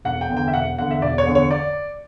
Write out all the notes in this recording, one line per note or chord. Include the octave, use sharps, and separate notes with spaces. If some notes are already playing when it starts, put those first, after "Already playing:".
E1 F#5
G5
E2 D3
G5
E5
E1 F#5
E2 D3 F#5
E5
E1 D5
C#5
E2 D3
C#5
D5